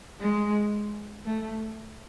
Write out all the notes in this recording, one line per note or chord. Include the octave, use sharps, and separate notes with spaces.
G#3
A3